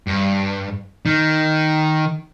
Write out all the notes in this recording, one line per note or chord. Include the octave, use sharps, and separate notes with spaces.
G2
D#3